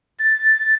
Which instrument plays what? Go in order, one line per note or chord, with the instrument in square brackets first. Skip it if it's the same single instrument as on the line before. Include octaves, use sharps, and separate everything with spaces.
[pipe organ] A6